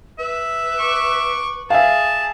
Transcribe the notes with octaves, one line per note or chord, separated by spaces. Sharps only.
B4 E5
C#6 D6
G#4 E5 F5 A5